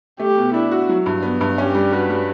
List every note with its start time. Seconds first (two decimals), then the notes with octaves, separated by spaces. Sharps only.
0.20 A3 G4
0.38 B2
0.54 D4 E4
0.71 F#4
0.89 F#3
1.06 G2
1.23 B3
1.41 G2
1.58 C#4 G4
1.75 G3
1.92 F#4 B4
2.10 G3